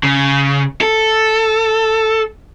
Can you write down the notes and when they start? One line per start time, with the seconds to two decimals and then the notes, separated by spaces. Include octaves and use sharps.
0.03 C#3
0.81 A4